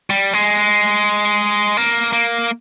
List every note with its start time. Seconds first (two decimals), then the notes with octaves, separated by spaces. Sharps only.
0.10 G3
0.33 G#3
1.77 A#3
2.13 A#3